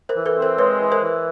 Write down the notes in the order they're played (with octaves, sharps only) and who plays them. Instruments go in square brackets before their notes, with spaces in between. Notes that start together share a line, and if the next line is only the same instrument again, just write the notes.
[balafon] A#4 C5
[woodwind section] E3
[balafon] A4 B4
[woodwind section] C4
[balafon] A#4 C5
[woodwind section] G#3 [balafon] B4 C#5
[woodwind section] E3
[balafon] A#4 C5
[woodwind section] E3